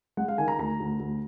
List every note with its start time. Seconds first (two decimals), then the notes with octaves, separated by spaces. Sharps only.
0.17 G#3 F#5
0.28 F5
0.38 D#3 G#5
0.48 A#5
0.59 D2 A#5
0.80 D2
1.00 D2